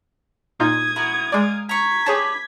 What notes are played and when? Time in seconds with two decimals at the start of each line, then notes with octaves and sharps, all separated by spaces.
0.60 A#2 D#4 F4 D#6 G#6
0.96 E4 F#4 A#4
1.32 G#3 A#4 D5 F5
1.69 A#5 C#6 G#6 B6
2.06 D4 G4 G#4 B4 C#5 A5